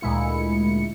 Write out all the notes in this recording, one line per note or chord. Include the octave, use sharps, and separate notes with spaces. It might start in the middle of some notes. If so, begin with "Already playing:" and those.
D2 A#2 G#3 E4 C#7